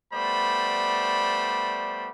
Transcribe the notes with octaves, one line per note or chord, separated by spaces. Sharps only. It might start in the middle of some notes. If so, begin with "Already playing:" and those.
G3 A3 B3 C5 D5 B5